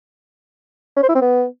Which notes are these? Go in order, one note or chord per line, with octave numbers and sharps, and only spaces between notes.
C#4
C5
E4
C4
B3